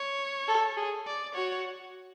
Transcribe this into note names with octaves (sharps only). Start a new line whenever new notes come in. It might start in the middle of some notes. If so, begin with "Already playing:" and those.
Already playing: C#5
A4
G#4
D5
F#4 C#5